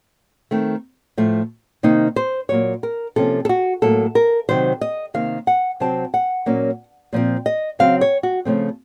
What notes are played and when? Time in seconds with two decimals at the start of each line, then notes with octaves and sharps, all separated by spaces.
0.51 D#3 A3 C4
1.18 A2 F3 A3
1.83 C3 D#3 A#3 D#4
2.16 C5
2.49 A#2 F#3 A#3 C#5
2.83 A#4
3.16 C3 F3 A#3 C#4 A4
3.45 A4
3.49 F#4
3.82 A2 F#3 A#3 A4
4.15 A#4
4.49 C3 D#3 F#3 C5
4.81 D#5
5.14 C3 D#3 A#3 F5
5.47 F#5
5.80 C3 F#3 C4 A5
6.14 F#5
6.46 A#2 F#3 A#3 C#4
7.13 A#2 F3 C4
7.46 D#5
7.79 C#3 F#3 C4 F5
8.01 C#5
8.23 F#4
8.45 C#3 F3 A3 C4